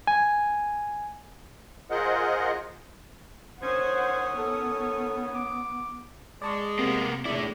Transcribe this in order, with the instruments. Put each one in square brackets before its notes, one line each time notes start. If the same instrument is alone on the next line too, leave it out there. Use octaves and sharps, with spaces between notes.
[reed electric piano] G#5
[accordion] F4 G#4 A#4 C5 D#5 F#5
[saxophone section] D#3 C#4 [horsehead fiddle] C5 F#5 [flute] D#6 [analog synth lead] G#6
[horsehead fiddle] B3 [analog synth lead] A4
[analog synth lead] D6
[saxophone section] G#3 [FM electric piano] D5 A5 C#6
[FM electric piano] C3 [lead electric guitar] A#3 B3
[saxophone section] E2 A#2 D4 [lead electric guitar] A3 E4 [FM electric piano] D5